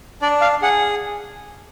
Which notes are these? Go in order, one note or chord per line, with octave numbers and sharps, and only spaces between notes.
D4 D5
F5
G#4 F#5